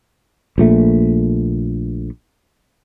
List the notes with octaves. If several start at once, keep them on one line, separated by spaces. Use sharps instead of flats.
A#1 A#2 A3